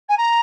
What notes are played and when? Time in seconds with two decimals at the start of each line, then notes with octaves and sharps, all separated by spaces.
0.08 G#5
0.17 A#5